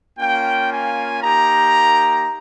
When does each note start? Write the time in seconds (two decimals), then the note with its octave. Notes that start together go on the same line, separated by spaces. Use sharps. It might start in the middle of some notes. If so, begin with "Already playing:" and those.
0.18 A#3 C#4 F4 G5
0.70 G#5
1.22 A#3 D#4 G4 A#5